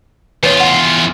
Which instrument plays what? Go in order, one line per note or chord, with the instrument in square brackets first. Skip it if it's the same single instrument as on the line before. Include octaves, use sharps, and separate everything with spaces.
[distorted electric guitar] E2 F4 [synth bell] B4 C#5
[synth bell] F#5